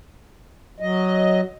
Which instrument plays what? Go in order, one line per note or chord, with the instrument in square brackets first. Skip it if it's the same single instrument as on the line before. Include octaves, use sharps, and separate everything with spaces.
[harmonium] F#3 D#5